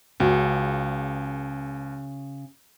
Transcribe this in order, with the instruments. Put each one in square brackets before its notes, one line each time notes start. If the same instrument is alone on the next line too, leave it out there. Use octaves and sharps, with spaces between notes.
[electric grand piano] C#2 [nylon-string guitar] C#3 F#4